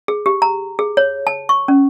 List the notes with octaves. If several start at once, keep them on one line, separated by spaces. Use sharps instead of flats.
G#4
G4
A#5
G#4
C#5
A5
C#6
C#4